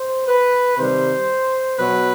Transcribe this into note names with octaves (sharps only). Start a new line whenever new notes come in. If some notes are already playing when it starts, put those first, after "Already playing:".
Already playing: C5
B4
C3 D#3 G3 C5
B2 F#3 B4